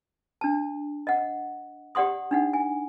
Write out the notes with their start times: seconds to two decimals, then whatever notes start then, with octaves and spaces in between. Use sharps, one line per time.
0.41 D4 A5
1.07 D#5 F#5
1.95 G4 D5 F#5 C6 D#6
2.31 D4 D#4 F#5
2.53 G#5